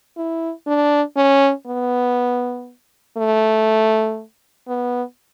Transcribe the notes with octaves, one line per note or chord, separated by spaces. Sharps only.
E4
D4
C#4
B3
A3
B3